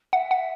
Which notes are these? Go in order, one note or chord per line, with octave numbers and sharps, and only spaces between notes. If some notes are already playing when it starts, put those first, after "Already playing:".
E5 F#5
F#5